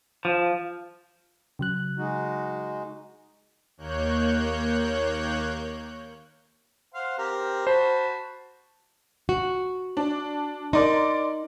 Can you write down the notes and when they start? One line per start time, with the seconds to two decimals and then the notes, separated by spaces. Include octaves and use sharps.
0.25 F3
1.59 C#3 F#3 F#6
1.98 G#3 D#4 F#4
3.77 D#2 A#3 C#5 F#6 G6
6.94 C5 F5 F#5
7.18 C4 G4 A#4
7.67 F#4 C5 A5 B5
9.29 F#4
9.97 D4
10.73 D#4 A#4 D5 C6